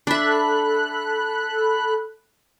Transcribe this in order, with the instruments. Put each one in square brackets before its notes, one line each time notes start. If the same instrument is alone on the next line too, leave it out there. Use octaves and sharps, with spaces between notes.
[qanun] D4 E5 [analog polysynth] A4 B5 F#6